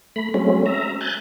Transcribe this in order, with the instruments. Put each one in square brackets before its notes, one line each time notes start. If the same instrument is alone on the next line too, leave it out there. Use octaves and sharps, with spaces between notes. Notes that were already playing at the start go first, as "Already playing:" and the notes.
[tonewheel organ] A3 B5
F#3 G#3 A3 C4 C#4
E5 A#5
G#5 F#6 G6 A6